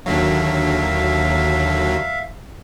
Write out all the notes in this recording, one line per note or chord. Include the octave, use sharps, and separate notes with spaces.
D#2 D3 F#3 E5 F5